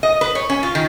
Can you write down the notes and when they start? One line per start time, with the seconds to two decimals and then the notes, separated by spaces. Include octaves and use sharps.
0.03 D#5
0.21 B4
0.35 C#5
0.50 C#4
0.63 F4
0.75 D#3